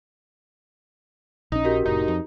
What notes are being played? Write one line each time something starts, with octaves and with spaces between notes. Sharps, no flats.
A#1 C#4 D#4
F#4 G4 A#4
F1 A2 D#4
F2